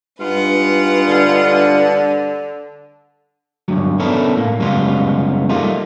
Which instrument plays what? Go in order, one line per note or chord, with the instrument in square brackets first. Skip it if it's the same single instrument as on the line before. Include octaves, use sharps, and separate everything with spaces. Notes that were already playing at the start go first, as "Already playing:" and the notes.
[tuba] G2 [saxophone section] G#3 D#4 F4 [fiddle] B4 F#5
[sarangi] D3
[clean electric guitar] D2 G2 F#3
B3 C#4 D4 E4 A4 A#4
A2 A#3
F#2 C#3 G3 G#3 B3 F4
G3 A3 A#3 D#4 F4